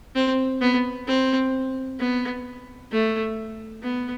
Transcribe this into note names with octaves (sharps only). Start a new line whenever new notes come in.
C4
B3
C4
B3
A3
B3